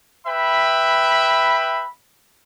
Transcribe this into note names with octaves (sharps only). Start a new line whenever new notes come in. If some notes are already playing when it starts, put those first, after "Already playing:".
B4 E5 G5 B5